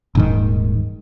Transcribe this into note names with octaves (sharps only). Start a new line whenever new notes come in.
D#1 G#2 D#3